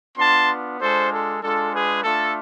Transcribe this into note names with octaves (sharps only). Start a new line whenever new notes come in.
B3 D4 F4 A5 C6
G#3 D4 F4 A4 C5
A4
G#3 D4 F4 A4
G#4 B4
A3 D4 F4 A4